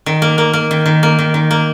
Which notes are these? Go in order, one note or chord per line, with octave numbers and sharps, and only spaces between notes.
D#3
A#3
A#3
A#3
D#3
D#3
A#3
D#3
D#3
A#3